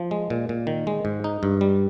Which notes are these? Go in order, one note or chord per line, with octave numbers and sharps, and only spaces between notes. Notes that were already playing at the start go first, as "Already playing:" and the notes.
Already playing: F3
G#3
A#2
A#2
D#3
G#3
G#2
D#4
G2
G3